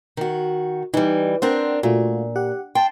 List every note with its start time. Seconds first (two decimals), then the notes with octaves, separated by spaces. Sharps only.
0.17 D#3 F#4
0.94 E3 G3 D#4
1.42 C4 D4 A#4 C5 F#5 G5
1.83 A#2 A3 F4 F#4
2.36 G4 F#5
2.75 G5 A5 C6